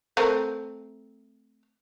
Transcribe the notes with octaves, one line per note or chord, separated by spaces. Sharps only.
A3 C4 A#4